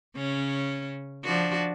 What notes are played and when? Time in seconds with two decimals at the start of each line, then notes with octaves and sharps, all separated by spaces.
0.16 C#3 C#4
1.24 F3 D4 F#4